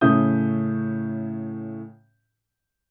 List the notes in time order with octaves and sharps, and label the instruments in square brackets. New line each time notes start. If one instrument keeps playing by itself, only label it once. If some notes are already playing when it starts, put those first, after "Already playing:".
[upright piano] A2 C#3 C#4 E5 D#6 G6